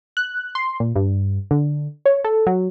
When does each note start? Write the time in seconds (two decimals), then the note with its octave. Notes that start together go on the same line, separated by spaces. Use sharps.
0.17 F#6
0.55 C6
0.80 A#2
0.95 G2
1.51 D3
2.06 C#5
2.24 A4
2.47 F#3